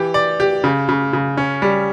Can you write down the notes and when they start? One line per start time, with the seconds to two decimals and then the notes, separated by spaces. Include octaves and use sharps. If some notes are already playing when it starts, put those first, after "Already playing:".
Already playing: E3 G4
0.14 D5
0.40 G4
0.64 C#3
0.89 C#3
1.13 C#3
1.37 C#4
1.62 G3